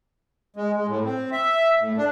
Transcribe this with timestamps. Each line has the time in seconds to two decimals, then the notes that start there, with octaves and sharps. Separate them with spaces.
0.56 G#3
0.76 G#3
0.87 A2
1.04 C4
1.32 E5
1.79 A2
1.97 D4